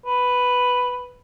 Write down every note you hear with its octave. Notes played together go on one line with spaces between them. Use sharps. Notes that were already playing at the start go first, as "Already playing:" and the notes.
B4